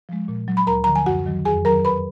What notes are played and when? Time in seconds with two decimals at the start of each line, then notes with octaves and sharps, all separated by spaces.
0.09 F3 G#3
0.28 A#2
0.48 F#3
0.57 B5
0.67 D2 A#4 A#5
0.84 D3 F3 A#5
0.96 G#5
1.06 F#2 F#4 F#5
1.26 D#3 F#3
1.45 F2 G#4 G#5
1.65 D#3 F#3 A#4 A#5
1.85 F#2 B4 B5